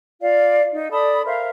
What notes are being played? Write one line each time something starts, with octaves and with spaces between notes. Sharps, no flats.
F4 D5 F5
D#4
A4 D5 B5 D#6
A#4 C5 E5 F5